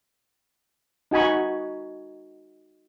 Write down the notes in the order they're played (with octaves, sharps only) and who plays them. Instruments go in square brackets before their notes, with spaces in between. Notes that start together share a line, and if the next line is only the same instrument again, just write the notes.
[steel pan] D#4 F#4 G#5 B5 C#6